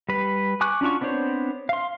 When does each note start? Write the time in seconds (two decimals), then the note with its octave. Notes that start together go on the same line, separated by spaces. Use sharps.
0.09 G3 B4
0.61 G#5 C#6 D6 F#6
0.81 C#4 D4 F4 F#4 C#6
1.01 B3 C4 D4 C5 C#5
1.69 F5 C6